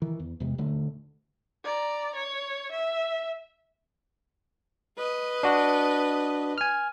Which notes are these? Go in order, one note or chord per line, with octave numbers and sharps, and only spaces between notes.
D#3 E3
E2
E2 C3 G#3
D#1 D2 D3 A3
D5 A#5
C#5
E5
B4 D#5
D4 F#4
G#5 F6